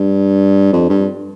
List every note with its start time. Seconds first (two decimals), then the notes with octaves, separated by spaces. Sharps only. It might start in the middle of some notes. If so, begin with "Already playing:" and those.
Already playing: G2
0.73 F2
0.89 G2